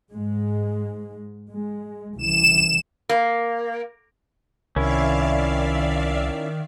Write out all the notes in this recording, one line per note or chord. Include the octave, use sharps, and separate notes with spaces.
G#2 G#3
G#3
C2 C#3 E3 E7
A#3
C2 D#3 C#4 E4 D5 E5 F5